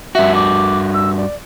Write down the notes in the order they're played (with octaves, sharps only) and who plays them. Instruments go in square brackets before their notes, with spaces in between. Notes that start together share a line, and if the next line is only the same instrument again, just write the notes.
[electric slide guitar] G2 F#4 [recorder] E5
[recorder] D6
E6
D5